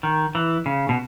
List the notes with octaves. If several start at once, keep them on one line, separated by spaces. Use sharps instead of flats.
D#3
E3
C#3
B2